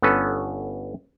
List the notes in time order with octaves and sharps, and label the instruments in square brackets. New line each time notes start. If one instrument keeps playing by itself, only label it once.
[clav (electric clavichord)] G1 B3 C#4 A4 B4